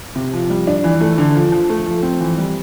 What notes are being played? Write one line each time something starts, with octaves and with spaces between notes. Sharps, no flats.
C3
F3
G3
D4
E3
A3
D3
F3
F3
A3
F3
C4
E3
G3